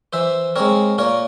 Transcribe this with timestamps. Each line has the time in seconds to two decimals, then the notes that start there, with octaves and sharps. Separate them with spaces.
0.13 E3 C5 E5
0.56 G#3 C4 A#4 C#5
0.98 A#2 A#4 C#5